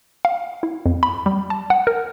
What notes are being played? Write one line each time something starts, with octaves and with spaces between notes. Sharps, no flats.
F5
E4
F2
B5
G3
A5
F#5
A#4